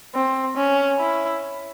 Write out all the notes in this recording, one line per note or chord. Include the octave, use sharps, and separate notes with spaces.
C4
C#4
E4